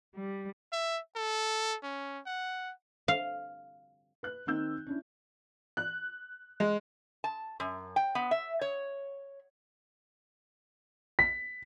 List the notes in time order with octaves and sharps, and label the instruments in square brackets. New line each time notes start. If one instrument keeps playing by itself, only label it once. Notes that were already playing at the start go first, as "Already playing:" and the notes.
[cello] G3
[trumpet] E5
A4
C#4
F#5
[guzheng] F5
[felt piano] B4 F#6
D#3 C4 D#4 E6 G6
C#4 D4 E4
[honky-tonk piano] F#6
G#3
[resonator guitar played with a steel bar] A5
F#2
G5
B3
E5
C#5
[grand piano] B6